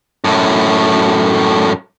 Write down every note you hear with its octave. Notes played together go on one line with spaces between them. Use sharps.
F#2 A2